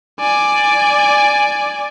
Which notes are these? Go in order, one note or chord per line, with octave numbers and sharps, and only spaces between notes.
D5 G#5